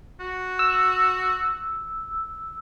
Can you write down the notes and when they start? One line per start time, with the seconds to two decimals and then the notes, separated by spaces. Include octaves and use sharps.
0.20 F#4
0.59 E6